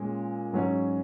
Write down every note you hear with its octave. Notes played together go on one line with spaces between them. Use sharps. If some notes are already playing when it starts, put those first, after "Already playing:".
Already playing: A#2 G#3 C#4
G#2 F#3 C#4